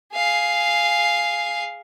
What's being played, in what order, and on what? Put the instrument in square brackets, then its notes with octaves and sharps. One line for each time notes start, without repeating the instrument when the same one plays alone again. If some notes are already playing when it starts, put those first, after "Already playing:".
[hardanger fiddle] G#4 F5